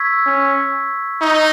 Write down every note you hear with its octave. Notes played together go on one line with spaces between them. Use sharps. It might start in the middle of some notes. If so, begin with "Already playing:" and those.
Already playing: C#6 E6 G#6 B6
C#4
D#4